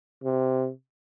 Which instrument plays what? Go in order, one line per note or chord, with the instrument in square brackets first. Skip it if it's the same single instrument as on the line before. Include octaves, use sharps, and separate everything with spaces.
[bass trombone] C3